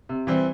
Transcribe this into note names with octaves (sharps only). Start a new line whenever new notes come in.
C3
E3 G3 C4